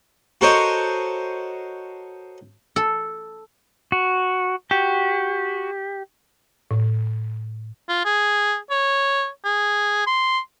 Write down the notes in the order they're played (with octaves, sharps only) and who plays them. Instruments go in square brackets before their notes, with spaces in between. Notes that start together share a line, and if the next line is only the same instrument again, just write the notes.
[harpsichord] F#4 A4 A#4 C5 C#5 D#5
[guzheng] A4
[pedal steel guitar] F#4
[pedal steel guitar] F#4 [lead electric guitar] G4
[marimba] A2
[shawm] F4
G#4
C#5
G#4
C6